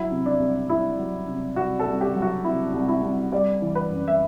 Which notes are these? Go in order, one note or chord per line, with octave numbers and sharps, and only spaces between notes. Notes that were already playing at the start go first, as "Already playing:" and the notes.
Already playing: F#3 E4
C3
D4
C2
C2 E4
F#3
C3
C2 F#4
A4
C2
G4
F#3
F#4
C3 E4
C2
E4
C2
G3 D5
E3
B4
F#2
E5